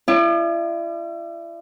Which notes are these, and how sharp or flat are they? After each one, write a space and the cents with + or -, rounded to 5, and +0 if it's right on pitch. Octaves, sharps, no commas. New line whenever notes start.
E4 +40 D5 +45